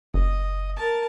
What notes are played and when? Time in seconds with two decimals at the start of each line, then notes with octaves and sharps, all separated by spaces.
0.14 F#1 D#5
0.77 A#4 A5